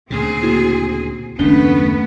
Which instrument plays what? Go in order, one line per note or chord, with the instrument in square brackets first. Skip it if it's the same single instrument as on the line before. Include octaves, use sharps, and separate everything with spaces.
[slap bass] D2 A#2 C#3 [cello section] C4 G#4
[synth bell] A#3 E4 F#4
[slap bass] F#1 D#2 [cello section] A3 B3 B4 [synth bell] C#4 D4 G7